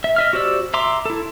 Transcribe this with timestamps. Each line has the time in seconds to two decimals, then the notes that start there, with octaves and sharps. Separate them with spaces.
0.04 E5
0.16 D#5 E5 F6
0.33 F#4 G4 C5 D5 E6
0.74 E5 A#5 C6 D6
1.06 E4 A4